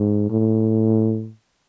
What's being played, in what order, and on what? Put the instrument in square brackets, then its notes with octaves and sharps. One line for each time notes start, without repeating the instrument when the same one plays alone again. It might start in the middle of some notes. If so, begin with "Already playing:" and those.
Already playing: [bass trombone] G#2
A2